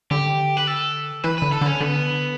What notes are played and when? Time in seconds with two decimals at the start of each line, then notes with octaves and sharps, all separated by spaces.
0.11 D3 G4
0.57 B4
0.67 A4
1.24 E3 B4
1.38 D3 B4
1.52 A4
1.61 D3 C#4
1.80 D3 B3